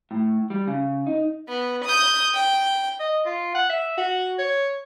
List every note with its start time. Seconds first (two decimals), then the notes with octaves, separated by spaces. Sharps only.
0.11 A2
0.50 G3
0.67 C#3
1.07 D#4
1.48 B3
1.85 D#6 G6
2.34 G5
3.00 D#5
3.26 F4
3.55 F#5
3.69 E5
3.97 F#4
4.38 C#5